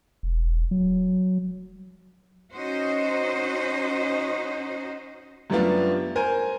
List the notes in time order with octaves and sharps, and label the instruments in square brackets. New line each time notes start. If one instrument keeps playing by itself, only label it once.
[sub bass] E1
F#3
[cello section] C#4 D#4 F#4 C5 D#5
[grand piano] F#2 G3 A3 B3 D4 F4
A#4 C5 G#5 D#7